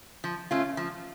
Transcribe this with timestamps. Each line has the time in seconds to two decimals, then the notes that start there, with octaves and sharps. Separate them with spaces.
0.24 F3
0.51 A3 C#4 F4
0.77 F3